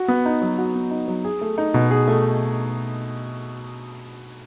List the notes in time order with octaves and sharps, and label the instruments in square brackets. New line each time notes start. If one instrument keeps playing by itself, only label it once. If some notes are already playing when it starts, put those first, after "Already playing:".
Already playing: [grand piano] F#4
B3
D#4
F#3
F#4
B3
D#4
F#3
G#4
A3
D#4
B2
G#4
A3